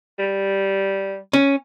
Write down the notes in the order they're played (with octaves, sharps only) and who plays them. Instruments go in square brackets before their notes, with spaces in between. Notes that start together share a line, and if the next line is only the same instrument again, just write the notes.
[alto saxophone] G3
[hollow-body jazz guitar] C#4